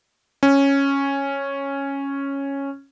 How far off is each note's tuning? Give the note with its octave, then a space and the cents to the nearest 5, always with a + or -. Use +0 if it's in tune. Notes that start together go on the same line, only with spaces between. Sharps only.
C#4 -5